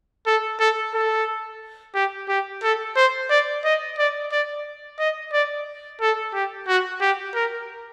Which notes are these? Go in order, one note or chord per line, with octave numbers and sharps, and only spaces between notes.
A4
A4
A4
G4
G4
A4
C5
D5
D#5
D5
D5
D#5
D5
A4
G4
F#4
G4
A#4